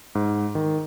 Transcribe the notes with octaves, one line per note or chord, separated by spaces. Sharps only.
G#2
D#3